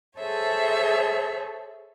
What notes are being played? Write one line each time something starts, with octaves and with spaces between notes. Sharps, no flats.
G#4 A4 C5 C#5 E5